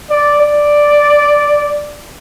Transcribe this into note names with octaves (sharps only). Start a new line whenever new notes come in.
D5
D5